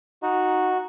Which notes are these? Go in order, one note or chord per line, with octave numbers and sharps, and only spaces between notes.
D#4 F#4